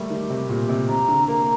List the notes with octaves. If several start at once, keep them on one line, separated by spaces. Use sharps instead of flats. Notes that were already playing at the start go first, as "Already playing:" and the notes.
Already playing: G3 A3 A#3
D#3 G4
C3
A#2 G4
C3
C3 A#5
D3
A#3 A#5